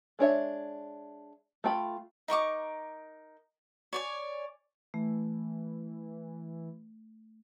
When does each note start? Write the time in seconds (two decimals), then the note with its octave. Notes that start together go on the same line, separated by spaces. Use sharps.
0.19 G#3 D4 C#5 E5
1.64 A3 F4 G5 A#5 B5
2.28 D#4 A#4 C#6 D6
3.93 C#5 D5 G#5
4.94 E3 A3